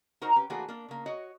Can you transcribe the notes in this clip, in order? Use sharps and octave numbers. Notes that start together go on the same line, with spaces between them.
D#4 F#4 A#4 C5 F#5 A#5
C#4 G4 B4
E3 A3 A#3 D4 F#4 G#4
A#3 D4
C#3 A#3
F#4 C#5 D#5